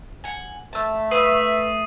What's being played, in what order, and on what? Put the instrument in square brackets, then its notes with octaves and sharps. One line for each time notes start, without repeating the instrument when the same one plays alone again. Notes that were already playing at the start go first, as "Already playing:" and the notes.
[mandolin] F#5 G#5
[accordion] A3 [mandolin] A5 E6
[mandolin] B4 F5 C#6 [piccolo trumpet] E5 [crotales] D#6 C7 D#7